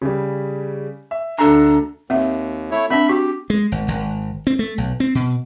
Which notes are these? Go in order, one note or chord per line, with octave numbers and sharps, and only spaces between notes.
C#3 G3
E5
D2 D4 A4 A#5
D#2 C4 E5
A3 E4 C#5
C4 D4 E5 B5
F#4 G4
G#3
G#1
G#1
C4
A3
B1
C4
B2